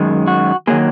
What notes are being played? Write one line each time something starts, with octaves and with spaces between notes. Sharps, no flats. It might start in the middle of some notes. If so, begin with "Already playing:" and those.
Already playing: F#2 D#3 G#3
F#4
D#3 F#3 A#3 G#4